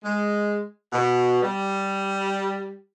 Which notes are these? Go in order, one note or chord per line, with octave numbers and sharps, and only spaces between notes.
G#3
B2
G3